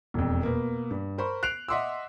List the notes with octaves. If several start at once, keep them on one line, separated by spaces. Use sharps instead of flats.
E1 F2
B2 A#3
G2
A#4 C5 B5 C#6
F#6 C7 D7 F7
D#5 E5 F#5 C6 D6 E6